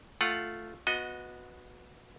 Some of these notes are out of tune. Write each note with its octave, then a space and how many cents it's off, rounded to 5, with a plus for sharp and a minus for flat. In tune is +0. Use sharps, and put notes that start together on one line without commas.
A3 +0 F4 +0 F#5 +5
B3 +0 F#4 -20 D#5 +10